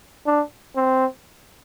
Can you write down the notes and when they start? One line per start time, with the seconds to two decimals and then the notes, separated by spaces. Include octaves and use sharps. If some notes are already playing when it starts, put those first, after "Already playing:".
0.26 D4
0.76 C4